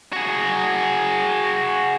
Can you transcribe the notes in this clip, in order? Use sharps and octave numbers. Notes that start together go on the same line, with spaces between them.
F#4 G#4